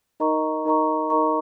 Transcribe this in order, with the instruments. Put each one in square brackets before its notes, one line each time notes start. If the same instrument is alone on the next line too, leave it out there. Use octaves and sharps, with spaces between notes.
[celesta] D#4 A#4 D#5 A#5 C#6
D#4 A#4 D#5 A#5 C#6
D#4 A#4 D#5 A#5 C#6